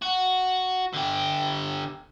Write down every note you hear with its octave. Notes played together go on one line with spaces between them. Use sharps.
F#4
D3 G4